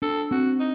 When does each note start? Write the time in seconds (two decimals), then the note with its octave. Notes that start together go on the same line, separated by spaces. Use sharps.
0.02 D4 A4
0.31 C4 F#4
0.60 D#4